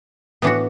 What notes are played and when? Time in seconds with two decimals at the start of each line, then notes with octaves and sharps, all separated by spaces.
0.42 A2 E3 B3 D4 F#4